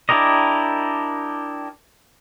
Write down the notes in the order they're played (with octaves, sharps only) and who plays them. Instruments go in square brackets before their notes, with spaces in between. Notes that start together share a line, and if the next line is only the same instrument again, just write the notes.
[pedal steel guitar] D4 E4 G4 A#4 D#5